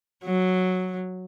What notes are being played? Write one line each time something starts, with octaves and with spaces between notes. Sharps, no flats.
F#3